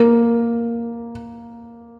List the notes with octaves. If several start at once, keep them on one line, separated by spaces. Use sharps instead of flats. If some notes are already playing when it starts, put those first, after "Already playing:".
Already playing: A#3